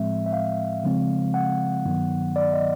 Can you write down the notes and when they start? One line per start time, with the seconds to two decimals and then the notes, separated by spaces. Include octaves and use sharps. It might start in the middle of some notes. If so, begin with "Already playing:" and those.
Already playing: A2 F3 G#3 C4 E5
0.26 E5
0.33 F5
0.84 C#3 F3 G#3 C4
1.34 F#5
1.85 G2 D#3 F#3 B3
2.36 D5
2.54 D#5